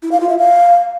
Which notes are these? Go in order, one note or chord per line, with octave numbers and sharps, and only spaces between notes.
E4
F5
F4
E5
F5